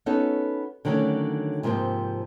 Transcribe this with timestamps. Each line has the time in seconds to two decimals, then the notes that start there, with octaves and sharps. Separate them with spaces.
0.06 B3 C#4 D#4 F#4 A4
0.85 D3 D#3 F#3 A3 C#4
1.63 G#2 C3 F3 A#3 C4